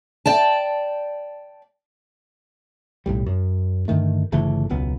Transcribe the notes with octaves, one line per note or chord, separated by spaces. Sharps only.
D5 G5 A5
B1 A2 G3
F#2
G2 D3 D#3 A3
G1 C#3 E3 A3
E1 C#2 F#3 B3